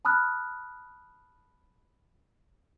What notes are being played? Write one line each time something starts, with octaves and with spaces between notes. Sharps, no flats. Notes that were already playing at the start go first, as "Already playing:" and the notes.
A5 B5 D#6 F6 F#6